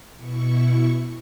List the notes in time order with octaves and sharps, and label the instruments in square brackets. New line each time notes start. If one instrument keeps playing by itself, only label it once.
[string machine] B2 E4 C#6